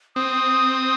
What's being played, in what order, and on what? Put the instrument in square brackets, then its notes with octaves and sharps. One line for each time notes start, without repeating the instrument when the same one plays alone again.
[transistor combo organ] C4 [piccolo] D#6